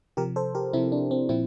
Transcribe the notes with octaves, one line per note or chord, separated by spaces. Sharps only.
C3 F3 G4 A#4
A4 C5
G4 A#4
C3 F3 C4 E4
D4
C4
A#2 F3 C4 E4